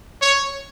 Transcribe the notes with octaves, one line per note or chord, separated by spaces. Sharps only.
C#5